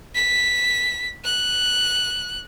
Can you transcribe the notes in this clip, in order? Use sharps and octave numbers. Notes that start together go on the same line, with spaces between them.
B6
F#6